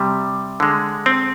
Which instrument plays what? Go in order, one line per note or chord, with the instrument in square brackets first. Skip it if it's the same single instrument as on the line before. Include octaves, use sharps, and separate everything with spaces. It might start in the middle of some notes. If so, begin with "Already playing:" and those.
Already playing: [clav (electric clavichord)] C3 G3
D3 G#3
C4